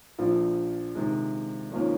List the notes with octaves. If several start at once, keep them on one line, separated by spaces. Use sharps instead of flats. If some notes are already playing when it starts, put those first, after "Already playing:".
A#1 A#2 F3
C3 D#3 G#3
G#1 F3 A#3 C#4